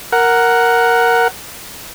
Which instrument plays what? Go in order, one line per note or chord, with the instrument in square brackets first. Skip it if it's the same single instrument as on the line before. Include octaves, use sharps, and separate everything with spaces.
[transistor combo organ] A#4 F#5